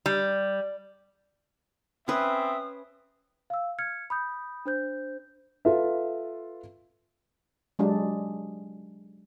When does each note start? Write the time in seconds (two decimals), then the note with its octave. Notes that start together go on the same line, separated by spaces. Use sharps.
0.06 G3
2.08 C4 C#4 B4 E5 D#6
3.50 F5 E6
3.79 F6 G#6 C#7
4.10 B5 D#6 G6
4.66 D4 C5 G6
5.65 F4 A4 B4 E5
7.79 F#3 G#3 D4 G4